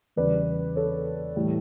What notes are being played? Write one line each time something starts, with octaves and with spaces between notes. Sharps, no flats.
E2 C#3 G3 B4 D5
A4 C#5
A2 E3 G3